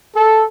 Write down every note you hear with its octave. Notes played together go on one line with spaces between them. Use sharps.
A4